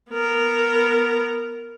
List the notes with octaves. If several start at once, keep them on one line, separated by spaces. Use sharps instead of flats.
B3 A#4